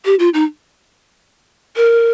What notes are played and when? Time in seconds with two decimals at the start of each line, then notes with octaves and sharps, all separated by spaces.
0.05 G4
0.19 F4
0.34 D#4
1.76 A#4